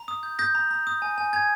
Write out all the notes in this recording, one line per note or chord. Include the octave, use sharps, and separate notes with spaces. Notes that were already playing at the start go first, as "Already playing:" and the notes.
Already playing: A#5
D#6
G6
D#6 G6 A#6
A#5
A#5
D#6
G#5
G#5
G#5 G#6